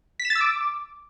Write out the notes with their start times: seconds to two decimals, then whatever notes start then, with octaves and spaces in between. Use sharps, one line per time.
0.20 B6
0.25 E7
0.30 A6
0.35 E6
0.41 D6